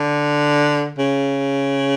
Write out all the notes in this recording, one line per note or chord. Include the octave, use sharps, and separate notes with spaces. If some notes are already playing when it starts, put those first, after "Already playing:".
Already playing: D3
C#3